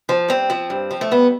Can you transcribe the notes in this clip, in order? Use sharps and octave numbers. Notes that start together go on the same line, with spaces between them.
F3
G2 C4
F3
G2
F3
A3
G2 B3